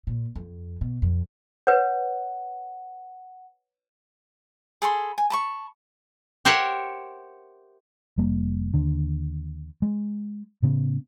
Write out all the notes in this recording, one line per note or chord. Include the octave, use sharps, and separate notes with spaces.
A#2
F2
B2
F2
B4 C#5 F#5
G#4 A4 B5 C6
G#5
A5 B5 C#6
G4 A#4 C5 C#5 E5 F#5
F1 G3 A#3
D#2 D3
G#3
A2 C#3 B3